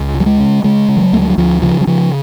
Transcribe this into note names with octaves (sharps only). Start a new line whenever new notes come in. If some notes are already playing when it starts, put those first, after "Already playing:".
Already playing: C#2
C#3
F#3
G#3
C#3
C#3 G#3
C#3
F3
F#3
D2 A3
G#3
F#3
D2 F3
C#3 F3
F#3
C#3 F3